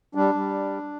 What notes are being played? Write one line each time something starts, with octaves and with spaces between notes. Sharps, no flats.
G3 D4
G3